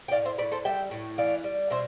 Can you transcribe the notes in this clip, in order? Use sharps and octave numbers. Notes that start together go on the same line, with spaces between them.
G5
A2 D5 F5
C5 E5
A2 B4 D5
A4 C5
G3 E5 G5
A2
E3 D5 F5
G3
B2 C5 E5